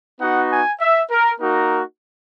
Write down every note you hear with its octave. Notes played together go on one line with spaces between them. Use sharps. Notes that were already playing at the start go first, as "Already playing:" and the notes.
B3 D#4 F#4 F#5
G#5
E5
A#4
A#3 D#4 F#4 A#4